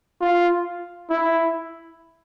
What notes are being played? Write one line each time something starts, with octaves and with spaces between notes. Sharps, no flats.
F4
E4